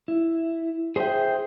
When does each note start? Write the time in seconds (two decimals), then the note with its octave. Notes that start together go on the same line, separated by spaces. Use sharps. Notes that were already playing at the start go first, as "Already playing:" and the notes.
0.08 E4
0.96 G#4 C5 D#5 E5 G5